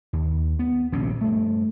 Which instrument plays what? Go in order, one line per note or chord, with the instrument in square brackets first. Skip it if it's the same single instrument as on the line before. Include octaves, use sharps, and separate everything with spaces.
[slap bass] D#2
B3
D#1 A#1 C3 C#4
G2 A3